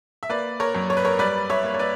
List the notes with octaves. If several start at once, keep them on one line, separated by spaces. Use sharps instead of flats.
E5
A#3 B4 D5
A#4 C#5
F#2
C#5
B4
A#4 C#5
G3 B4 D5
C#5 E5
A#3
C#5
B4 D5